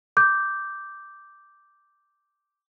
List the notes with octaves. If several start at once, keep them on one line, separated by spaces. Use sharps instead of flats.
D6 G6